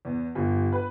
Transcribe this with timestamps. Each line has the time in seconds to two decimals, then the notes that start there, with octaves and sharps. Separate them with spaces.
0.05 E2
0.35 G1
0.72 B4